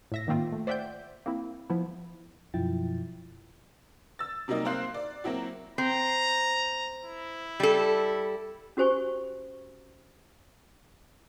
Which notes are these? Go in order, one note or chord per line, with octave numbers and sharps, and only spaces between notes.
A2 E5 A#6
G#2 D#3 A#3 C4 F4
A3
C5 D5 E5 F#5 G5 G6
A#3 C4 E4
F3 B3 E4
F#2 B2 F3 E4 G5 A6
E6 A6
C3 F#3 G3 A#3 D#4
A#3 C4 C5 F5 F#6 C7
D5
F#3 A#3 C4 E4 F#4
C4 A#5
E4
G3 A4
C#4 F#4 G4 C5 G#5 C#6